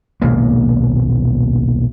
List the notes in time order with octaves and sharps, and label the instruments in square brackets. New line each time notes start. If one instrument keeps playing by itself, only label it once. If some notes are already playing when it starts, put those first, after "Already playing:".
[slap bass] D#1 B1 G#3 A#3